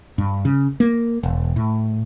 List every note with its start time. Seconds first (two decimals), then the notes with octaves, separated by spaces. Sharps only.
0.18 G2
0.45 C#3
0.80 A#3
1.23 E1
1.56 A2